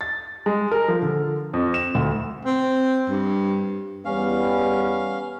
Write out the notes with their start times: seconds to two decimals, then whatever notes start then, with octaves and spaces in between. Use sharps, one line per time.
0.01 A6
0.46 G#3
0.71 A#4
0.88 F3
1.02 D3
1.53 F2
1.74 E7
1.95 D2
2.45 C4
3.09 G2
4.05 E2 G3 B3 C#4 F5